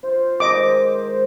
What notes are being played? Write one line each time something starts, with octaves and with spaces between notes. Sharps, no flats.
F4 C5
D#3 G#3 D#5 D6